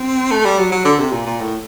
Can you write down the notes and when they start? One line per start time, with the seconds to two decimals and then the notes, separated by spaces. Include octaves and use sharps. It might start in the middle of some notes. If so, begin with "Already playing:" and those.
Already playing: C4
0.31 A3
0.45 G3
0.59 F#3
0.72 F#3
0.85 D3
0.99 C3
1.12 A#2
1.26 A#2
1.40 A2